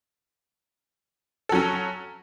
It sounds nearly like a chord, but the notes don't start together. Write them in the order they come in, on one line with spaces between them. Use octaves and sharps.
A4 F#3 C#4